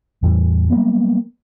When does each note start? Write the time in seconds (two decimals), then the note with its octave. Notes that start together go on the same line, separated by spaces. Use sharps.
0.23 E2 A2 E3 G3
0.70 F#3 G3 A#3 B3